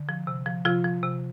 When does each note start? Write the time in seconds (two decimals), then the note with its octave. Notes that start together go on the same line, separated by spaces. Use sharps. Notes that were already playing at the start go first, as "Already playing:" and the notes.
Already playing: D3
0.09 F3
0.27 C3
0.46 F3
0.65 C3 F3 F4
0.84 F3
1.03 C3